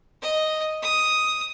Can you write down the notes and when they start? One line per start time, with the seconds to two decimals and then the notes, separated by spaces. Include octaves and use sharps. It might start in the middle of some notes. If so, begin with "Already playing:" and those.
0.22 D#5
0.83 D#6